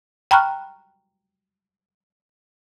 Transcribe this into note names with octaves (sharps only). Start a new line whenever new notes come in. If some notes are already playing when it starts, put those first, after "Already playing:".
G5 A#5 B5 C#6 F6 F#6